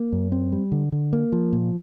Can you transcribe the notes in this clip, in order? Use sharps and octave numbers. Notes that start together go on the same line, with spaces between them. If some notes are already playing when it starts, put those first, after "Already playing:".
Already playing: A#3
F#2
C4
G3
D3
D3
A#3
F3
A#2